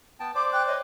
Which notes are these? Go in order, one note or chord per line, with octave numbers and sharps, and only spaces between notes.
B3 G5 A5
C5 D5 D6
G5 F#6
C#5 D#5